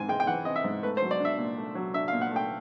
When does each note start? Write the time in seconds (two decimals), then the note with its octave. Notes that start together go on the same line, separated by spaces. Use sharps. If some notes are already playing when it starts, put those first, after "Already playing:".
Already playing: G#2 E3 C4 G#5
0.09 G#3 G5
0.20 G5
0.27 E3 F#5
0.45 C4 D#5
0.56 E5
0.64 G#2
0.83 A3 B4
0.97 C5
1.02 F#3
1.11 D5
1.20 D4 E5
1.38 A#2
1.57 A3
1.75 F#3
1.94 D4 E5
2.08 F5
2.13 A#2
2.21 F#5
2.31 A3 G5